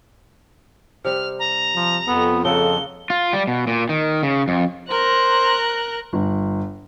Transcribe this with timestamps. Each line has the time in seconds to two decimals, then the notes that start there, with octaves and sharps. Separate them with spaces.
1.04 C3 G3 F6
1.39 A#5
1.75 F3
2.08 F2 B3 A4
2.45 C#3 A#3 A4 F#5 G7
3.10 F4
3.33 G3
3.48 B2
3.67 A#2
3.89 D#3
4.23 C#3
4.48 F2
4.91 A#4 C5 A#5 F#6
6.13 G1